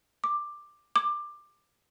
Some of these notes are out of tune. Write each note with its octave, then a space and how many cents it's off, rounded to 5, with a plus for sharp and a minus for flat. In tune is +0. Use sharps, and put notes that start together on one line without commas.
D6 +10
D6 +15